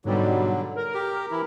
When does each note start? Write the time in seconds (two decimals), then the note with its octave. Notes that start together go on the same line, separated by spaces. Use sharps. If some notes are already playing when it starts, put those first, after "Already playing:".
0.05 G#2 B2 D3 F#3 G3
0.76 A#4
0.94 G4
1.31 E3 E4